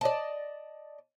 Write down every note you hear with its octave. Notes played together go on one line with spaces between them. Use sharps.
D5 D#5 A5